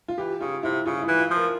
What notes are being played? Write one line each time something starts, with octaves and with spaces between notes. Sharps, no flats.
F4
E3 G4
C#3 F4
C3 E4
C#3 F4
E4
E3
F4
F3
A#4